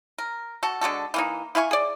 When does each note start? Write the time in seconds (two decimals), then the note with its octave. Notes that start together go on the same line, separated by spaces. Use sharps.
0.18 A#4
0.63 F#4 A4
0.81 D3 G#3 F#4 A4
1.14 E3 A#3 D#4
1.55 E4 F5 G#5 C#6
1.71 G#4 D5